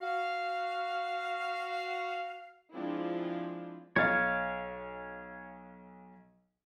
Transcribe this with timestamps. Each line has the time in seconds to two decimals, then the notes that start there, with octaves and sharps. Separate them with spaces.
0.01 F#4 F5
2.73 F3 G#3 C4 D4 E4 F4
3.96 B1 C#5 D#5 F5 A6